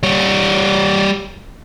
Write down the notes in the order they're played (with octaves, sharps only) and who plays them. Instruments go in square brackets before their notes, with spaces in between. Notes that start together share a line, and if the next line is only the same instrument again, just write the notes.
[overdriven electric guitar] G3 C#5